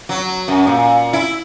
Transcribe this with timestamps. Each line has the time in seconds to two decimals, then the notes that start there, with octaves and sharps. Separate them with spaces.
0.09 F#3
0.48 F#2
0.67 A#2
1.13 E4